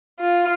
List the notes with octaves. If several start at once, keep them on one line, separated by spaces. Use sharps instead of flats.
F4